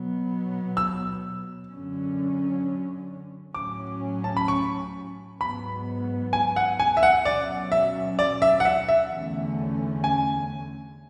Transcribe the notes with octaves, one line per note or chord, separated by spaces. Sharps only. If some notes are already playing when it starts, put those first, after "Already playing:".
Already playing: B2 F#3 B3
E6
F#2 D3 F#3 C#4
A2 F#3 C#4 D6
A5
B5
C#6
G#2 F#3 B3 B5
G#5
F#5
G#5
E5
F#5
B2 F#3 C#4 D5
E5
D5
E5
F#5
E5
E5
E2 D3 A3 C#4
G#5